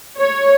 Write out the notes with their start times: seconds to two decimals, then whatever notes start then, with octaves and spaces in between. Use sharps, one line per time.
0.18 C#5